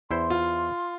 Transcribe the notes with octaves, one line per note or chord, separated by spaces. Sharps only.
E2 E4 C5 C6
F4